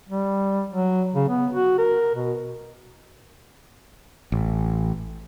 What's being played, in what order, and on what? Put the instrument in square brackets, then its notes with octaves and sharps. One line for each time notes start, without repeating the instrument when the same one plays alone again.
[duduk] G3
F#3
C#3
B3
F#4
A#4
B2
[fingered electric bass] A1